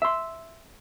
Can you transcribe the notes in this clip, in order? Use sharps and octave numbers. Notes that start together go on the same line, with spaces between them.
E5 C6